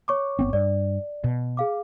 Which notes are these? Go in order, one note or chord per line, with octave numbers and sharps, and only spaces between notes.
C#5 C#6 D6
G1 B3 C4
G2 D5
B2
G#4 F5 D6